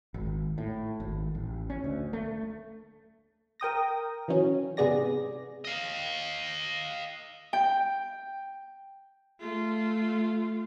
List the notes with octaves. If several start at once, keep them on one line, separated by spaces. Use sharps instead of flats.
G#1
A2
G#1
A1
C#4
D2
A3
A#4 G5 D#6 A#6
E3 F#3 C#4
G#2 C3 B3 G#4 D5 A#6
D#5 F5
G5
A3 F4